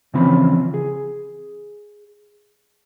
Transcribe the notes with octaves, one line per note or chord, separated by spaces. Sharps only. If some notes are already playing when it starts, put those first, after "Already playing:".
C#3 E3 F3 C4 C#4 B5
G#4